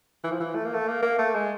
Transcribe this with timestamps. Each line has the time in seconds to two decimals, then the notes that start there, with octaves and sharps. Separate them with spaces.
0.24 E3
0.31 F3
0.40 E3
0.55 A3
0.65 A#3
0.73 A3
0.88 A#3
1.02 A#3
1.19 A3
1.35 G#3